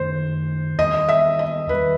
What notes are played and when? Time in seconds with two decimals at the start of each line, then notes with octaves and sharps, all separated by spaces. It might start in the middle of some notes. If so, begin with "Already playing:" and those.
Already playing: F#2 D#3 A3 C5
0.78 E2 D#3 G3 D#5
1.09 E5
1.39 D#5
1.69 E2 D#3 G3 B4